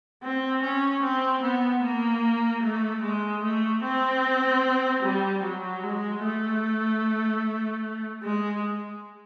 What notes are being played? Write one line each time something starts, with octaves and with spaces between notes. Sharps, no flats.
C4
C#4
C4
B3
A#3
A3
G#3
A3
C4
G3
F#3
G#3
A3
G#3